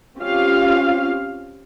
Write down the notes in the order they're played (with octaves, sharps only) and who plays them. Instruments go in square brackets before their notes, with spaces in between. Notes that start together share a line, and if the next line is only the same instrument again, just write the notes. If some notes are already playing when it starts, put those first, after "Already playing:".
[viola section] C4 C#4 F4 G4 F5